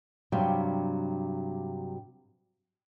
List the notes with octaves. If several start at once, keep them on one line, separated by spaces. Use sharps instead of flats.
G2 C3 F#3 F5 G5